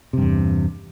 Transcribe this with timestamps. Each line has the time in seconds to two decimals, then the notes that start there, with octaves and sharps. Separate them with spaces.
0.13 C3
0.18 G2
0.22 E2